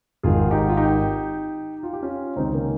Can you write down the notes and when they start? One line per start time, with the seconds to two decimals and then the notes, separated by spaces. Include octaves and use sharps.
0.23 G#1 G#2 D#3 F4 G#4
0.51 D#4 G4
0.69 F4
0.77 D#4 G4
1.83 F4
1.93 G4
2.03 C#4 F4
2.36 C#2 C3 D#3 C4 D#4
2.54 A#3 C#4